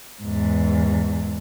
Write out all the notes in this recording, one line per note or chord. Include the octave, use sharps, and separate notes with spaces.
E2 G#2